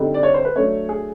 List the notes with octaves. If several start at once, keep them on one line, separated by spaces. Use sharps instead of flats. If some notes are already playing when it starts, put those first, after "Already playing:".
Already playing: D3 G3 C4 D#4
D5
C#5
C5
B4
F#3 A3 D4 C#5
G#4